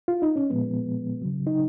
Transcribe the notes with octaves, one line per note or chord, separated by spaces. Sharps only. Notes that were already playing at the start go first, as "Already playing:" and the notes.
F4
D#4
C#4
A#2 F3 G#3 B3
C#3 F#3
D#4